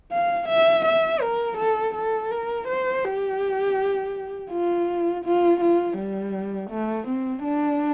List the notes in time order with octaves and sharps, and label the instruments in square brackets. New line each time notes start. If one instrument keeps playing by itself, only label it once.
[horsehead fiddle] F5
E5
E5
A#4
A4
A4
A#4
C5
G4
F4
F4
F4
G3
A3
C4
D4